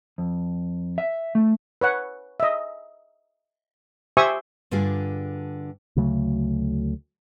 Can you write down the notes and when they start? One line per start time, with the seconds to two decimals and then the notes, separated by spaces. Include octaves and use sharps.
0.18 F2
0.98 E5
1.35 A3
1.81 B4 C#5 F#5
2.40 D#5 E5
4.17 G4 C5 E5 G#5 C#6 D#6
4.71 G2 D3 D4 F4 G#4
5.97 D2 C#3 F#3 A3